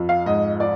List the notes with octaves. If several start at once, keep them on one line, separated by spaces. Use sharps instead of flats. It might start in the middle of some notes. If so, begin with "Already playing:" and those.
Already playing: F2
F5
G#2 D#5
F3 D5